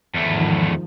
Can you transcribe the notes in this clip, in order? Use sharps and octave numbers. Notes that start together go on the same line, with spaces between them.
E2 G#2 D#3 F3 A3